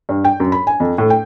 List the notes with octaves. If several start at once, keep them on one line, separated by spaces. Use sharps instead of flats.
G2
G5
F#2
B5
G#5
F2
A2
G5